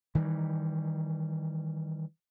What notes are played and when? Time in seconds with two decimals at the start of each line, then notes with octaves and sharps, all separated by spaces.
0.15 D#3 E3 G3